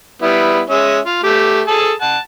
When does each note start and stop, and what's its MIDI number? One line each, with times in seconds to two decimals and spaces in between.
0.22 0.61 55
0.22 0.61 59
0.22 0.61 64
0.70 0.99 56
0.70 0.99 61
0.70 0.99 76
1.06 1.23 65
1.23 1.61 57
1.23 1.61 67
1.68 1.92 68
1.68 1.92 69
1.68 1.92 81
2.02 2.18 78
2.02 2.18 81